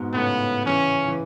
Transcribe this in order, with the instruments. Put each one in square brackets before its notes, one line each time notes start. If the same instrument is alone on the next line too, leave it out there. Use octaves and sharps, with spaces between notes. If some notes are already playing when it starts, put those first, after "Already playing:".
Already playing: [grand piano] G#2 B2
[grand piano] A2 C#3 [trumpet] B3
[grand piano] C#3 E3 [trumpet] C#4
[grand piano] E3